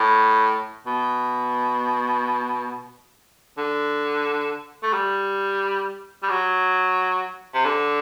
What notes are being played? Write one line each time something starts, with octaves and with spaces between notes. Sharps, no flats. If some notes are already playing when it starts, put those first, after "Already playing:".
Already playing: A2
B2
D3
A3
G3
G3
F#3
C3
D3